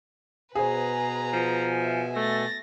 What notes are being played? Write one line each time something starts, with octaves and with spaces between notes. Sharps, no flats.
B2 G#4 B4 C5 G#5 A#5
F3
E5
A3 A6 A#6